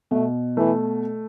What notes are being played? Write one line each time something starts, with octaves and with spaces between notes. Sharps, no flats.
B2 A3
E3 A3